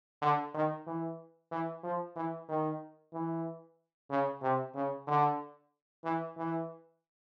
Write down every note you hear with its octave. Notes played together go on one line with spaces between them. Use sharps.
D3
D#3
E3
E3
F3
E3
D#3
E3
C#3
C3
C#3
D3
E3
E3